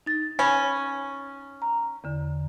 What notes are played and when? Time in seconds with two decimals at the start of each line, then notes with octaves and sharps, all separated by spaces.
0.06 D#4 A6
0.39 C#4 B5
1.62 A#5
2.04 E2 D3